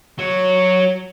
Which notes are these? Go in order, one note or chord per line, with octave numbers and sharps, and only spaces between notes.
F#3 C#5